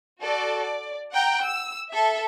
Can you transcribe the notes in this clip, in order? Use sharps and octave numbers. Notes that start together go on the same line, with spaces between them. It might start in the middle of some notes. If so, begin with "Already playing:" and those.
F#4 A4 D5
D5
F#5 G5 A#5
E6
A4 E5